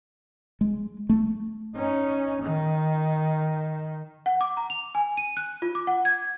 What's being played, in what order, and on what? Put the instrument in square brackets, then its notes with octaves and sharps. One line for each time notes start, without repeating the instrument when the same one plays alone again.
[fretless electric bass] G#3
A3
[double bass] C#4 D#4
D#3
[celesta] F#5
D6
A#5
F7
G#5
D#7
F#6
F4
D6
F#5
G#6